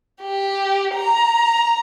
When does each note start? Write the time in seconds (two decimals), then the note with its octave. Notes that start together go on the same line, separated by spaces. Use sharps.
0.22 G4
0.95 A#5